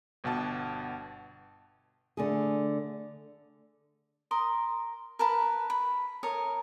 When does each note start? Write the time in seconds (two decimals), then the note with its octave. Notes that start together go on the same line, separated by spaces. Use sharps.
0.24 G1 B2 F#5 A5
2.17 D3 A3 G#4
4.31 A#4 C6 D#6
5.19 A#4 B4 A5 B5
5.70 B5
6.23 A4 A#4 C#5 D#6